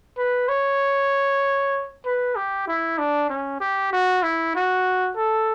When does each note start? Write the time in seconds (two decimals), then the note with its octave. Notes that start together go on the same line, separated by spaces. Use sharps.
0.18 B4
0.49 C#5
2.05 B4
2.36 G4
2.67 E4
2.98 D4
3.30 C#4
3.61 G4
3.93 F#4
4.23 E4
4.55 F#4
5.17 A4